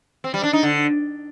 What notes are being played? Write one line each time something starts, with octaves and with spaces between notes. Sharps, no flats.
C4
G3
D4
D#4
D3